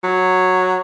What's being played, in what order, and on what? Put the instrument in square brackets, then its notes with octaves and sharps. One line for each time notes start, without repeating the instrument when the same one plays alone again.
[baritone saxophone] F#3